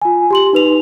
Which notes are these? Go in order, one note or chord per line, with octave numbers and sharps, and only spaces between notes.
F4 G#5
G4 C6 F#7
D#4 B4 F7